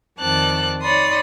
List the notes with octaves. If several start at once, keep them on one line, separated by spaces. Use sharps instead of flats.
F2 D#3 C4 D5 A5 F#6
D#4 C#5 D5 B5 C6 D#6